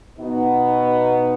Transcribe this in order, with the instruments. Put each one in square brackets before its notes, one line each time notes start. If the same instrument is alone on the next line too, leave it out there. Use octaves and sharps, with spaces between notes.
[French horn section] B2 B3 D#4